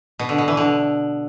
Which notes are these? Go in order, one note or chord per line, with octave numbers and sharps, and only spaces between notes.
B2
D3
B2
E3
D3